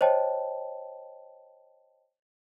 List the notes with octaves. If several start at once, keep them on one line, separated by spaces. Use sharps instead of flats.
C5 C#5 D#5 G5 A5